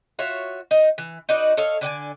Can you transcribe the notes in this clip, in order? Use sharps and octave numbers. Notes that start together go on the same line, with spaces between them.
F4 F#4 C#5 E5
D#4
E3
D#4 F#4 B4 D5
A4 C#5 D#5 F5
D3 D5 G5 G#5